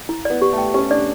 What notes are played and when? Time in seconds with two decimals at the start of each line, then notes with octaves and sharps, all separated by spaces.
0.09 E4
0.25 B3 D5
0.42 G4
0.53 A3
0.58 G5
0.74 C#4 G4
0.90 D4 D5